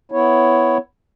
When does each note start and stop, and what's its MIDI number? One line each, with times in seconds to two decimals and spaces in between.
0.12 0.78 59
0.12 0.78 64
0.12 0.78 73